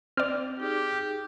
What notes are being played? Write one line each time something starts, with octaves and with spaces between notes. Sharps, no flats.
C4 D5 F6
D#4 G4 G#4